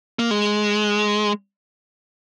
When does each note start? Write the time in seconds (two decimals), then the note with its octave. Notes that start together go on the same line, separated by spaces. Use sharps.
0.19 A#3
0.31 G#3